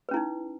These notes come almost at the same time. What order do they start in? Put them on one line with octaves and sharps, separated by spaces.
B4 C#4 E4 D#4